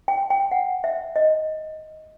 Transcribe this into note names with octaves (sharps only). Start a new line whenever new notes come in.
G5
G5
F#5
E5
D#5